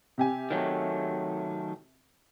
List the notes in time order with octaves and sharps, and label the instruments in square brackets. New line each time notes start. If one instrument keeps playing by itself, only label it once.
[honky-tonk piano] C3 G4 G#5
[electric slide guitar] D#3 F#3 A3